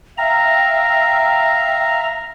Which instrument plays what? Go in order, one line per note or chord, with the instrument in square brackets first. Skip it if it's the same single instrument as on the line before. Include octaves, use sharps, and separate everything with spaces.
[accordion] E5 F5 [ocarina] G5 [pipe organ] A#5